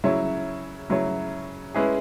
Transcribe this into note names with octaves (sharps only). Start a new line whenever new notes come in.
C#3 F#3 E4 C#5
C#3 F#3 E4 C#5
G#3 C#4 E4 G#4 B4